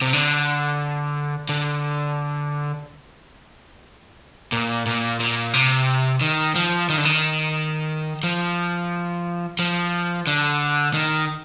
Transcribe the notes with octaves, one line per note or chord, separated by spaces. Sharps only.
C3
D3
D3
A#2
A#2
A#2
C3
D#3
F3
D#3
D3
D#3
F3
F3
D3
D#3